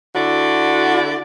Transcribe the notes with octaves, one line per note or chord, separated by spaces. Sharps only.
D3 E4 F#4 D5